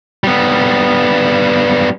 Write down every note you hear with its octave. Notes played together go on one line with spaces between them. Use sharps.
G3 B3